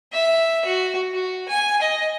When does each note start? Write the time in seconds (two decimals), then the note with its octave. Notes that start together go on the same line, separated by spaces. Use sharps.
0.12 E5
0.65 F#4
1.12 F#4
1.48 G#5
1.82 D#5